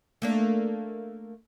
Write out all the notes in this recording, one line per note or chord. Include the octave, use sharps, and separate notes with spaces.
A3 A#3 D4